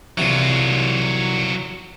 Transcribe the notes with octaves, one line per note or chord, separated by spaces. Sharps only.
C2 E3 F#3 F4